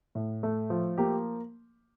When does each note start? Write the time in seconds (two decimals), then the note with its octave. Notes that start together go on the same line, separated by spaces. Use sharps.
0.15 A2
0.43 A3
0.70 F3
0.98 A#3 G4